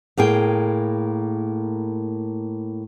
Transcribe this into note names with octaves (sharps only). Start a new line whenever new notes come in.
A2 A#3 G#4 G5